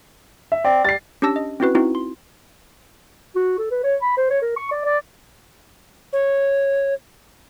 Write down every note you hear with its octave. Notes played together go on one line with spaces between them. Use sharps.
E5
C4 D5
G3 A6 C7
C#4 D4 G4 A5 E6 A#6
D#5
C4 C#4 E4 F#4 B4
C4 D#4 E4 F#4
C6
F#4
A4
B4
C#5
B5
C5
C#5
A#4
C#6
D5
D5
C#5